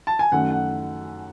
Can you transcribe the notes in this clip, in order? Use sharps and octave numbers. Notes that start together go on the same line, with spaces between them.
A5
G#5
F#2 D#3 A3 F#5
F#5